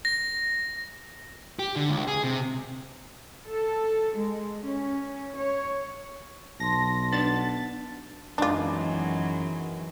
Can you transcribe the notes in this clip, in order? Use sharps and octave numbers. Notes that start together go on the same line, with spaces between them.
A#6
G4
D3
C#2
G#4
C3
A4
G#3
C#4
C#5
B1 A5 C6 A#6
B3 D4 A6
F#2 D#3 E3 F#3 G#3 B3 D4 F4